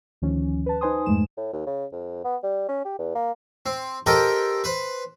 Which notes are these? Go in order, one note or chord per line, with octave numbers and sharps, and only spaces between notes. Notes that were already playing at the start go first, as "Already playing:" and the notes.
D2 D#3 F3 C#4
B4 A5
D#4 B4 C5 G#5 C6 D#6
F2 G#2 G#3 A3 E7
A2
D#2
C#3
F2
B3
G3
C#4
G4
E2
A#3
C4
G4 A4 A#4 C5 D#5 G5
B4 C5